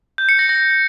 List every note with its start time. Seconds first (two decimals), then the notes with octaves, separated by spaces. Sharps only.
0.18 G6
0.29 C#7
0.39 A#6
0.49 A#6